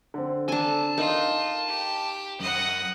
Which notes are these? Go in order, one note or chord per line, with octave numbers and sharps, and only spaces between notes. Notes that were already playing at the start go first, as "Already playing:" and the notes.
D3 C4
D4 A4 G#5 A5
D#4 F4 A#4
G4
F#2 D#5 F#5